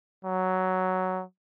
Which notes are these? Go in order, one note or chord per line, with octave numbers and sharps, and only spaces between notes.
F#3